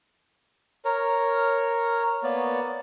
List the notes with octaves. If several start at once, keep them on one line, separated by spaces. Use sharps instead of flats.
A#4 C#5
A#3 B3 C#5 D5